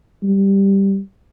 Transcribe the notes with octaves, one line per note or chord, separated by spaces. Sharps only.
G3